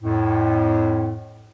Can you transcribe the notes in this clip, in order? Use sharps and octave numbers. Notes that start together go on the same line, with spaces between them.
F2 A2